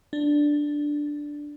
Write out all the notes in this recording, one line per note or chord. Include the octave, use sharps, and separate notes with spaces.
D4